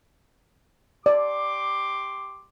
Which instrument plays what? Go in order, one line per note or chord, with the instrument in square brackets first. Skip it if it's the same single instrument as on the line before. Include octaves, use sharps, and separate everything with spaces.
[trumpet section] G4 C6 D6 [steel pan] D5